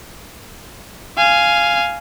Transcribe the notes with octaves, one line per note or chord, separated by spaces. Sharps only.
F5 G#5